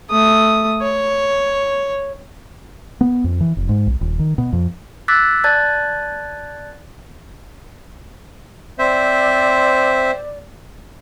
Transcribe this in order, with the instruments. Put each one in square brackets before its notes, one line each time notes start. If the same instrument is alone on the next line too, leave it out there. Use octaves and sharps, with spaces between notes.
[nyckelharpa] A3 D#6
C#5
[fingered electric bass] B3
F2
E3
F1
G#2
B1
D#1
D#3
B2
F2
[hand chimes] D6 E6 F#6 A6 B6
D5 A5 F#6 G#6 A6
[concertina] C4 C5 E5 [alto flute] D5